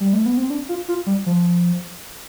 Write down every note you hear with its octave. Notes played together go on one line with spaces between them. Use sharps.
G3
A3
B3
C4
D4
F4
F4
G3
F3